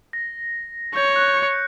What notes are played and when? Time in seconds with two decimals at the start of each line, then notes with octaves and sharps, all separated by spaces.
0.13 A#6
0.95 C#5 G6
1.16 F#6
1.37 C#7